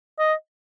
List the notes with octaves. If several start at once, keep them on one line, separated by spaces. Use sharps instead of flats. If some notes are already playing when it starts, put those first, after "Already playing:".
D#5